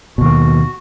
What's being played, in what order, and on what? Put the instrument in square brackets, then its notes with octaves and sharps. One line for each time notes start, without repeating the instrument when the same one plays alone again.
[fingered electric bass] D#2 B2 [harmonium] F#4